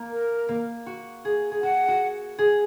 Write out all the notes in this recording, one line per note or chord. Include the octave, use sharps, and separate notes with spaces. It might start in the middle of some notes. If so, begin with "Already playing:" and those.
Already playing: A#3
A#4
A#3
F#4
G#4
G#4
F#4 F#5
F#4
G#4